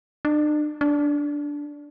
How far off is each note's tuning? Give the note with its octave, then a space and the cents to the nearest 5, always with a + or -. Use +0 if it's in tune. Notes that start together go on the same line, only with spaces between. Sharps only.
D4 +40
D4 -10